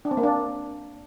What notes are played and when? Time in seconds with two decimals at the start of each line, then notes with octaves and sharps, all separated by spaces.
0.05 D4
0.11 C4
0.17 A#3
0.23 D4